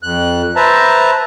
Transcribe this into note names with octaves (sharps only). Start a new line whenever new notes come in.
F2 F#6
B4 C5 E5 A5 A#5